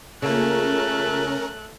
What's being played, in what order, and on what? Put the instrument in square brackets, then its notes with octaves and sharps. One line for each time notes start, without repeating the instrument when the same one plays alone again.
[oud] C#3 A#3 [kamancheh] A3 F#6 [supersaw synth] C#4 A#4 [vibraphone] F4 G#4